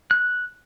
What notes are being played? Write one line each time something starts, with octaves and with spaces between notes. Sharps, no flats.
F#6